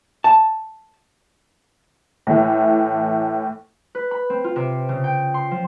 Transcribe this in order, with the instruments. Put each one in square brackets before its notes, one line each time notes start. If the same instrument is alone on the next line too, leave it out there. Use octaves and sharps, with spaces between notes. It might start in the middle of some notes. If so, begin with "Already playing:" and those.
[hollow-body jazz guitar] A5
[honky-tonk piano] A2 E3 A3
[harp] B4
B5
C4
F4
C3
C#3
G5
C6
F3